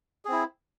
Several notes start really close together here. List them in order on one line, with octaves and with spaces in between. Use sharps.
G#4 C4 E4